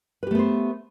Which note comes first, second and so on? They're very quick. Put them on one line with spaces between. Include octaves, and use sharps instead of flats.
B4 G4 A3 B3 C5